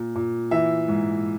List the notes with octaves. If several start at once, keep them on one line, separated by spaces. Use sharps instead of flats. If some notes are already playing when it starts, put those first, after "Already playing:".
Already playing: A#2
A#2
E3 E5
G#2